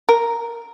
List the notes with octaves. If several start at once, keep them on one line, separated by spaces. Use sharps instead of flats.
A#4